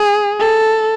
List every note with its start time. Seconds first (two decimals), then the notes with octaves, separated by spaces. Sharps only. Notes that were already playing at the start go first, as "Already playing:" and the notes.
Already playing: G#4
0.40 A4